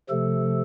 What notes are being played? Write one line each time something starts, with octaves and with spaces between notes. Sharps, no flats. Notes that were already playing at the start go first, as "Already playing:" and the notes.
C3 F3 A3 A4